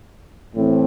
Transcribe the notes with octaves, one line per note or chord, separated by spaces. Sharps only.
A2 E3 A3 C4